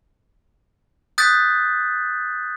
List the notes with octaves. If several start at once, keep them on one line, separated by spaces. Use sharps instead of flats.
D#6 F#6 G6 A6 B6